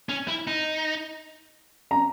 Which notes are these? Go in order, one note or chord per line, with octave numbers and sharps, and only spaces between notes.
C#4
E4
D#4
A#5